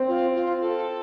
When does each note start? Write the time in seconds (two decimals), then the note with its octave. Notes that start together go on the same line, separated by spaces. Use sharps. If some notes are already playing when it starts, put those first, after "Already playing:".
Already playing: C4
0.08 F4
0.34 F4
0.61 A4